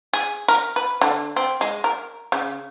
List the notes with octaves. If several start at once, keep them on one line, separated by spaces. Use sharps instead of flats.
G#4
A#4
B4
D3
C4
G#3
A#4
C#3